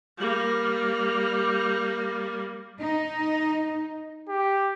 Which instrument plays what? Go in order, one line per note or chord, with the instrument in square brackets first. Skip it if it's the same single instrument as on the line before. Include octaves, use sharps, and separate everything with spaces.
[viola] G3 A#3
[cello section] D#4
[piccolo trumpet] G4